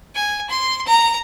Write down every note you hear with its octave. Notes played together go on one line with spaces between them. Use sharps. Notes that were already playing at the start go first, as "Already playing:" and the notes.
G#5
C6
A#5